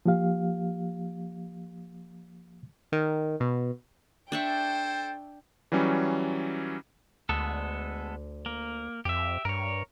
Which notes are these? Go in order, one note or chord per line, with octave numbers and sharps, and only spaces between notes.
F3 A#3 G4 F5
D#3
B2
D4 A4 C5 E5 G5 C#6
E3 F#3 G3 C#4
D2 G#3 B3 A4
A#3
F2 G4 E5
G2 A#4 C#5